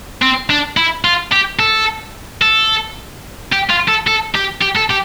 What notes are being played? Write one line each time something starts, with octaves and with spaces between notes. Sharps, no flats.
C4
D4
E4
F4
G4
A4
A4
G4
F4
A4
A4
G4
G4
A4
G4